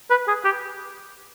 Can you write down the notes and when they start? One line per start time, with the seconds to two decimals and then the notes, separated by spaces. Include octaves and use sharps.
0.11 B4
0.28 G#4
0.45 G4